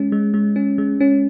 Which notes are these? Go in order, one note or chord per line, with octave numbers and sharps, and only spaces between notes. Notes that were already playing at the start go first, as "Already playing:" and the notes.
Already playing: G#3 C#4
G#3
G#3
C#4
G#3
C#4